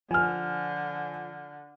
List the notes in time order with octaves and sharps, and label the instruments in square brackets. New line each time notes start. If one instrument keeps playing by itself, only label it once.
[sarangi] D3 [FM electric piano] F3 [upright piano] G#5 F6